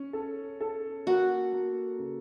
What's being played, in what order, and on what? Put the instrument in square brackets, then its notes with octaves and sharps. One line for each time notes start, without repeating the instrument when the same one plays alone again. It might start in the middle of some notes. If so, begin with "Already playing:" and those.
Already playing: [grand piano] C#4
A4
A4
[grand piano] A#3 [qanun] F#4
[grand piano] A#3
C#3